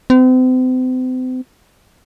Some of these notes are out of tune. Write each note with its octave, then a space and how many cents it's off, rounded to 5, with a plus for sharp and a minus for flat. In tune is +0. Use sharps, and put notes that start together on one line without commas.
C4 -40